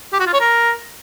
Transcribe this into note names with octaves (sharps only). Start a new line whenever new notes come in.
G4
F#4
F4
C#5
A#4